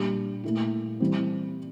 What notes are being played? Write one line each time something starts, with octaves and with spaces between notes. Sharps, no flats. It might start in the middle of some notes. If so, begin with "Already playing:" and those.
Already playing: A#2 G3 D4 G4
A#2 A3 E4
E3 G3 C4